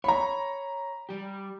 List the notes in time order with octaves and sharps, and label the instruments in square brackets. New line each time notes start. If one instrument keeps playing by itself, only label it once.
[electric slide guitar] C#5 [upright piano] A#5 B5
[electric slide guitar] G3 G4